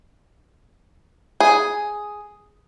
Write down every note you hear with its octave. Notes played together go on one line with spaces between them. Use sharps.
G#4